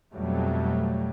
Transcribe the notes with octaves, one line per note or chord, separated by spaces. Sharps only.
F2 B2 F#3 G3 A3